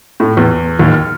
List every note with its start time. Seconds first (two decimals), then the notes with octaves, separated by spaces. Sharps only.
0.20 A2
0.37 E2
0.79 D#2
0.92 F6